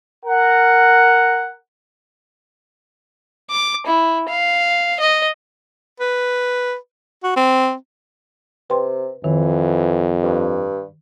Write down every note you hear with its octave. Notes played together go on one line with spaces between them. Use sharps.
A#4 F#5
D6
E4
F5
D#5
B4
F#4
C4
C3 B4 G5 C6
F2 D#3 E3
G2